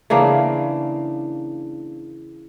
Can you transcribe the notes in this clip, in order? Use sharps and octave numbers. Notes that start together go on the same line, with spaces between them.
C#3 E3 A#3 D4